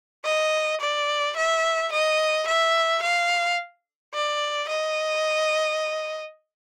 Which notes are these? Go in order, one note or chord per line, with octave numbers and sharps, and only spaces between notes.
D#5
D5
E5
D#5
E5
F5
D5
D#5